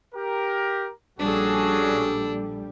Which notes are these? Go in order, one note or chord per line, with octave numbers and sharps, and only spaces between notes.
G4 A#4
A#1 G3 C#4 D4 F#4 G#4 A4